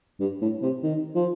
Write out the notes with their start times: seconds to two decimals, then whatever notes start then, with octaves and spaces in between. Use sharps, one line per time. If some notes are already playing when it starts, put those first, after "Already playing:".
0.20 G2
0.41 A2
0.62 C3
0.83 D#3
1.15 F3